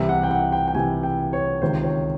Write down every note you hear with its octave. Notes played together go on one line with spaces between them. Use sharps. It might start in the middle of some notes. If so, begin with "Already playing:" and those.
Already playing: C2 C3 E3 E5
F#5
G5
F#5
G5
G5
C2 C3 E3 G#5
G5
C#5
C#2 C3 D#3 C5
C#5